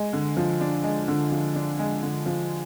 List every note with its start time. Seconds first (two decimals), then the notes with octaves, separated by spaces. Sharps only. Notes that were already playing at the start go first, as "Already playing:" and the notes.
Already playing: G#3
0.13 D3
0.37 F3
0.61 D4
0.84 G#3
1.08 D3
1.31 F3
1.55 D4
1.79 G#3
2.03 D3
2.26 F3